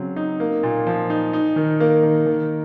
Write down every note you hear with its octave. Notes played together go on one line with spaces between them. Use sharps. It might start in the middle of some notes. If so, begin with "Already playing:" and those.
Already playing: C#3 F#3 C4
D#4
A#3
A#2
F3
D#4
D#4
D#3
A#3
D#3
D#3